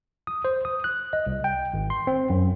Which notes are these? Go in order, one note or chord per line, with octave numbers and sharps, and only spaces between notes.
D#6
C5
D#6
F#6
D#5
C2
G5
G#1
C6
C4
F#2